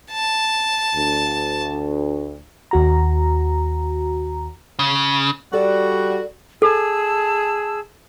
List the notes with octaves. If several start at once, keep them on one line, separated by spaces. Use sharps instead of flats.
A5
D2
D#2 F#4 A#5
C#3
G3 F#4 A4 D5
G#4 A4 A5 E6